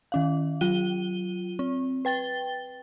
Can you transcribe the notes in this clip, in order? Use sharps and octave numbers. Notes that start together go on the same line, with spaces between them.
D#3 C#4 F5
F#3 F4 D#7 G7
C4
B4 G5 A6 G7